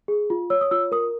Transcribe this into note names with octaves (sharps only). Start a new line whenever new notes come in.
G#4
F4
C#5 E6
D#6
F4 E6
A#4 D#6